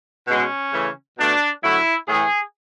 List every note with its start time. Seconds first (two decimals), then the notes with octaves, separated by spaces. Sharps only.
0.27 B2 G#3 C#4
0.73 C#3 E3 A3
1.18 B2 A3 D4
1.63 D3 F#3 A3 E4
2.08 A2 E3 A3 G#4